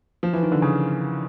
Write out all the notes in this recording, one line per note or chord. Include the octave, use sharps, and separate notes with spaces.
F3
E3
D#3
D3
C#3